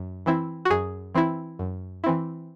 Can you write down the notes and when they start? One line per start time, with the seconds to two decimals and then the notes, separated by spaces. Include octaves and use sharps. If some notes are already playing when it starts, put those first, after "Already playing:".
Already playing: F#2
0.26 E3 C4 E4
0.65 F#4
0.70 F#2 G#4
1.14 E3 C4 E4
1.59 F#2
2.04 E3 C4 E4